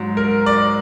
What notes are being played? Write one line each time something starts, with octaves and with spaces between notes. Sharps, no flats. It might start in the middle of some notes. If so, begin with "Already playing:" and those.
Already playing: G#2 F#3
A#4
D5